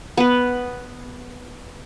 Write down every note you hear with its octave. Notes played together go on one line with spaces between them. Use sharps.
B3 B4